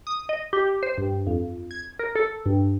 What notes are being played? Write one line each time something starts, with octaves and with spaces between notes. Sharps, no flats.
D#6
D#5
G4
C5
G2
F2
G#6
A#4
A4
G2